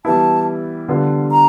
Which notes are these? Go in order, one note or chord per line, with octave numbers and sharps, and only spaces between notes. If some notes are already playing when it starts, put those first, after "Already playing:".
E3 G3 B3 E4 A5
D3 G3 B3 D4 F4
A#5